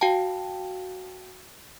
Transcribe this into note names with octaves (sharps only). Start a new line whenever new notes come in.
F#4 F5 G5 A5